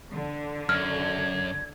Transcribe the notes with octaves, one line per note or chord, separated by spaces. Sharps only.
D3
F#2 F6 G#6